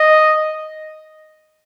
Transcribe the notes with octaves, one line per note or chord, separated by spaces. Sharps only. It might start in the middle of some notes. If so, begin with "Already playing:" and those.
Already playing: D#5